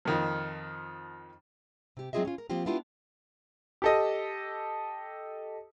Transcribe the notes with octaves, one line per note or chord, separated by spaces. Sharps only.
F2 D#3 F3
C3 G4
F#3 C4 F4 G#4 D#5 E5
C#4 F4
A#4
F3 A#3 C4 F4 G4
B3 D4 E4 F4 G4
G4 A4 D#5